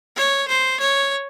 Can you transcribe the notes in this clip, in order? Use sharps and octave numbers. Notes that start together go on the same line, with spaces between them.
C#5
C5
C#5